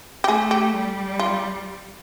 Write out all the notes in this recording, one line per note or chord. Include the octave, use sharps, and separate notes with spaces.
G4
A3 G#4
G4
G3
F4